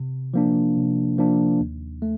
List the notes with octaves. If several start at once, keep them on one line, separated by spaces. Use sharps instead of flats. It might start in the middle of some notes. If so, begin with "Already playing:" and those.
Already playing: C3
F3 A#3 D4
C3
F3 A#3 D4
D#2
A3